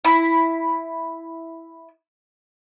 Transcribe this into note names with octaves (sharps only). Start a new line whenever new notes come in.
E4 B5